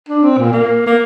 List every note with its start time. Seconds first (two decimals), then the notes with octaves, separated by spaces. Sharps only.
0.09 D4
0.23 C4
0.38 A#2
0.53 A#3
0.87 A#3